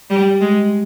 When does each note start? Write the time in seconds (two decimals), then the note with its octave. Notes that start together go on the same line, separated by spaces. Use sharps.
0.10 G3
0.41 G#3